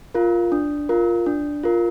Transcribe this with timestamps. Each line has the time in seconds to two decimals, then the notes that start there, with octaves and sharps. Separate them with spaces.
0.15 F4 A#4
0.52 D4
0.89 F4 A#4
1.26 D4
1.63 F4 A#4